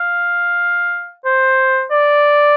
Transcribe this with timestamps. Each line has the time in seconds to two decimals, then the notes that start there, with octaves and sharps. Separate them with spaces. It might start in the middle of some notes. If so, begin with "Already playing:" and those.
Already playing: F5
1.25 C5
1.91 D5